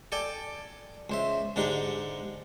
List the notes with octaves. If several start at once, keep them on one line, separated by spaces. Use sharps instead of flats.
A4 D5 G5 G#5
C#2 C5 E5
G#2 D3 D4 D#4 G4